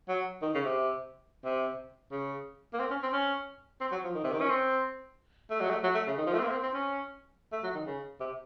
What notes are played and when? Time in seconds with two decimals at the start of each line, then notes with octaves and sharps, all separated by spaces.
0.09 F#3
0.42 D#3
0.54 C#3
0.65 C3
1.45 C3
2.12 C#3
2.74 A#3
2.80 C4
2.90 C#4
3.02 C4
3.13 C#4
3.81 C4
3.92 F#3
4.04 F3
4.15 D#3
4.24 C3
4.32 D#3
4.41 C#4
4.49 C4
5.50 A3
5.61 F#3
5.71 A3
5.83 F#3
5.95 A3
6.07 C#3
6.18 D#3
6.27 F3
6.34 A3
6.39 C4
6.43 A#3
6.51 C4
6.63 C4
6.74 C#4
7.52 A3
7.64 F#3
7.75 D#3
7.86 C#3
8.20 C3